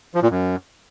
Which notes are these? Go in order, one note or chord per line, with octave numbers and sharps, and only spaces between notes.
F3
A#2
F#2